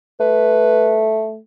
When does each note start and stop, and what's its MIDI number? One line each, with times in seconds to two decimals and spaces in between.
0.20 1.39 57
0.20 1.03 71